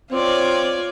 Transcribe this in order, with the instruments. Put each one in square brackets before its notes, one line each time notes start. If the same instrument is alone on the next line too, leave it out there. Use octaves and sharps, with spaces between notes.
[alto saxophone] C4 [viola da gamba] F4 C#5 D5